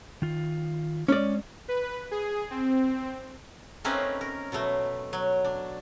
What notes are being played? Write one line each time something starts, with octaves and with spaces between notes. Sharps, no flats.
D#3 F4
G#3 C#4 D5
B4
G#4
C4
A3 A#3 C4 C#4 D#4 B4
A#4
B2 F#3 A3
F#3
D4